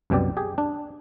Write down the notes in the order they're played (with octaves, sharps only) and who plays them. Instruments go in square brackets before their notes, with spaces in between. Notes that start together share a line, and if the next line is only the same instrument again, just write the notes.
[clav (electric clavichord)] C2 F#2 B2 G4 D5
G4 G#4
D4